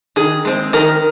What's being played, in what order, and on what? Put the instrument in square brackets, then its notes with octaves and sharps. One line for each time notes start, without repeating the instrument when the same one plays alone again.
[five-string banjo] D#3 G#4
G#3 C4
D#3 A#4